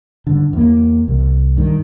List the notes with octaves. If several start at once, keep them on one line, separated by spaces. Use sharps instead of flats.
G2 D3
E2 A#3
C2
G2 D#3